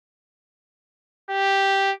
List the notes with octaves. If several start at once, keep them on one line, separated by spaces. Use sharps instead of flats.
G4